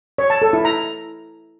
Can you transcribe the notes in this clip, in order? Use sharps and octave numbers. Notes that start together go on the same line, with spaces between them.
C#5
A5
A4
E4
A#5